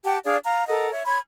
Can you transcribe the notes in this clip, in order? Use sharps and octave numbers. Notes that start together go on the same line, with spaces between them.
G4 F#5 G5 A5
D4 G#4 D5 F5
F5 A#5
A4 A#4 D#5 F#5
C#5 E5
C#5 B5 C6 G#6